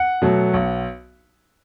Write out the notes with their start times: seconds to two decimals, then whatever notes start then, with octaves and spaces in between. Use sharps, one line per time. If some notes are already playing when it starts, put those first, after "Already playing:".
Already playing: F#5
0.22 B2 F#3 A3
0.54 B1